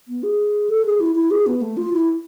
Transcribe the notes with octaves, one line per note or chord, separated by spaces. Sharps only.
B3
G#4
A4
G#4
E4
E4
G#4
B3
A3
F4
E4